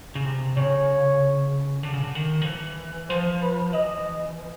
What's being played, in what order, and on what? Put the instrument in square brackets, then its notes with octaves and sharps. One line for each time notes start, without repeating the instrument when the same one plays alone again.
[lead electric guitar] C#3
C3
[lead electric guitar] C#3 [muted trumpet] C#5
[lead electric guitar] D3
C#3
D3
D#3
F3
E3
[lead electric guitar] F3 [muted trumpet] C5
[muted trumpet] B4
[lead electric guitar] E3 [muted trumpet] D#5